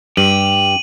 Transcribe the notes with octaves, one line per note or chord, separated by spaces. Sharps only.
G2 G4 D#7 F#7